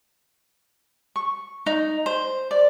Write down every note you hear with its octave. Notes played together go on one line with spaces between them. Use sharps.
C#6
D#4
C5
D5